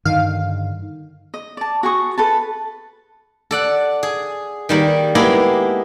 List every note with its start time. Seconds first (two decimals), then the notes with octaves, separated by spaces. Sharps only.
0.05 G2 D3 D#3 F5
1.34 D#5
1.57 D5 A5
1.83 F#4 G#4 C#6 D#6
2.18 A4 B4 A5
3.51 A4 D5 F#5
4.03 G#4
4.69 D#3 G3 A#3
5.15 G#3 A#3 B3 E4 G4 G#4